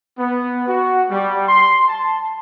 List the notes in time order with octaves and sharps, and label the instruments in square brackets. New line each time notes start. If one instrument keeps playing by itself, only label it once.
[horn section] B3
F#4
G3
C6
A5